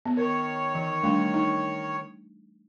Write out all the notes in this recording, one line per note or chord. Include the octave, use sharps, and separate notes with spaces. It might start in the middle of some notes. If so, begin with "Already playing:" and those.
B3
D#3 A#4 C#5
E3
G3 A3 D4
D#4